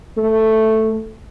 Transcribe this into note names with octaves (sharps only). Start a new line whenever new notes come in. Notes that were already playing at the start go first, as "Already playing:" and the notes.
A3